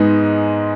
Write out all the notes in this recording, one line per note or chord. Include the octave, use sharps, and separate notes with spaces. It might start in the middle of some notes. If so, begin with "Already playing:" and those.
Already playing: G#2 G#3 B3 D#4